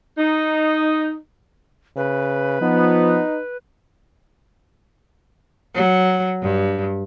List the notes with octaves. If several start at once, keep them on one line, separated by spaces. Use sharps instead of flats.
D#4
C#3 B4
F3 B3 D#4
F#3
G2